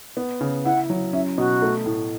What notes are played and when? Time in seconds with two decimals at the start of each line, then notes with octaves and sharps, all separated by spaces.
0.17 B3
0.41 C#3
0.65 E4 F#5
0.90 F#3
1.13 C#4 E5
1.38 B2 F#4
1.62 A3
1.86 A2